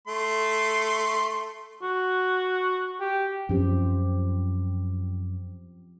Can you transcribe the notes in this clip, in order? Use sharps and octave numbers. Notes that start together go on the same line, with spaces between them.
A3 C6
F#4
G4
F#2 F3 C4 C#4 G4